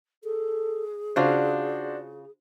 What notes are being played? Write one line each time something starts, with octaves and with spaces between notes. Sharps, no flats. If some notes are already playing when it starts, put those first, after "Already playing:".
G#4 A4
C#3 D4 F4 F#4 C5 D5 F5